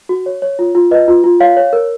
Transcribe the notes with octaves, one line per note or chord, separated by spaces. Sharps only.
F#4
C#5
C#5
F4
F4
B4 D#5
F4
F4
C#5 F5
C#5
A#4